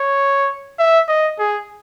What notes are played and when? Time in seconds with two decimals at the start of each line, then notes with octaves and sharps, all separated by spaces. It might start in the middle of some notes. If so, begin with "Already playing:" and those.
Already playing: C#5
0.79 E5
1.08 D#5
1.39 G#4